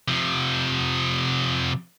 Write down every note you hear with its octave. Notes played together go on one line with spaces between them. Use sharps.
C3 F3